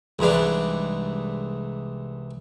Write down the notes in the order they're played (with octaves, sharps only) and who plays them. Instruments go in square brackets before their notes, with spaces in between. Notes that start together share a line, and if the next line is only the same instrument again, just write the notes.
[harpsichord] C2 G#2 E3 D4